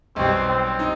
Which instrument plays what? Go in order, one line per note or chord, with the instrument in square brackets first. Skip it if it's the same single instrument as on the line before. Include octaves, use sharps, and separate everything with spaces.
[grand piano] B1 B2 G3 [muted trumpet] C4
[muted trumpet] C4
[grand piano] D#4